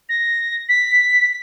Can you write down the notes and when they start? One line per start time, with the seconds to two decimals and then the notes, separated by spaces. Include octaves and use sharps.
0.09 A#6
0.69 B6